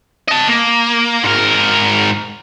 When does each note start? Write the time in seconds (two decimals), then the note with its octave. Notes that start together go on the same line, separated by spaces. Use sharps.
0.28 D#5 A5
0.48 A#3
1.24 G#2 A#4